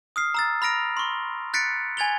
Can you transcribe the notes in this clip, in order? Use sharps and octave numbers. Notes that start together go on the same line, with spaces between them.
D#6 F6 C7
A#5 E6 A6
B5 F6 A#6 D7 F7
C6 C#6
F#6 A6 B6 C#7 D7
G#5 G#6 A6 F7 G7